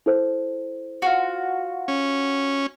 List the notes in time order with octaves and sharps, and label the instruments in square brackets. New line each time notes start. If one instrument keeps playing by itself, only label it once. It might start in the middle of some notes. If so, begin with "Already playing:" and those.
[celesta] E4 A4 C5
[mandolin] F4 F#4
[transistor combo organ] C#4